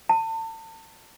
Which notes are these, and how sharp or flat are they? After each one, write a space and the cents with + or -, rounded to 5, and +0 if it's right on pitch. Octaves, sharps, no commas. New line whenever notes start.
A5 +35